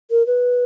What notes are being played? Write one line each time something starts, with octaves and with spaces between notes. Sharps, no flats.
A#4
B4